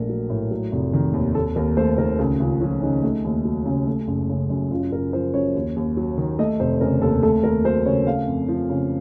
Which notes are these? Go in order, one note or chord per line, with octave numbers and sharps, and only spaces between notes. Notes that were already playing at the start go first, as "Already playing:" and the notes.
Already playing: A#1 A3 A#4
F#3
A2
F#3
F1
D#3
D#2
D#2 A4
D#2 A#4
A3 C5
D#3 A#4
C#2 A4
C#2 F4
F3 C#4
C#3 D#4
A3
D#2
F#3
C#3
A3
F#1
C#3
F#2
F#1 F4
F#1 A#4
F3 C5
F#2 C#5
D#2
D#2
F#3
D#3
A3 D#5
F1 C5
C#3 A#4
D#2 A4
A3 A4
D#2 A#4
F#3 C5
C#3 C#5
A3 F5
F2
F3
C#3